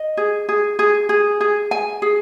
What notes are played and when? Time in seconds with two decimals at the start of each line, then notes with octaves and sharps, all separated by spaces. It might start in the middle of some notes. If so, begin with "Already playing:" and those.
Already playing: D#5
0.17 G#4
0.49 G#4
0.79 G#4
1.09 G#4
1.40 G#4
1.71 G#5
2.02 G#4